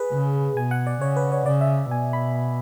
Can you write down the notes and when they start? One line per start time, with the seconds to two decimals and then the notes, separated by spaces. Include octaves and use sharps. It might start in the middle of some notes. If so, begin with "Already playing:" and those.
Already playing: G#4 B4
0.12 C#3
0.57 B2 G#5
0.71 F#5
0.87 D5
1.01 C#3 C#5
1.16 B4
1.32 C#5
1.46 C#3 D5
1.61 E5
1.91 B2 G#5
2.13 B5